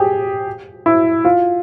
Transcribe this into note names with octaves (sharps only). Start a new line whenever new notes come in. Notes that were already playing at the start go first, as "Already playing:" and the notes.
Already playing: G4 G#4
E4
F4